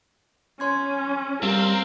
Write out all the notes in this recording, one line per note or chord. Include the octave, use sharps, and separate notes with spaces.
C#4 C#5 C6 G#6
G3 C4 A#4 F5 F6